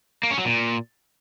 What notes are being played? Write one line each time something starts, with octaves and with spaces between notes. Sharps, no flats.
A#3
C#4
F#3
A#2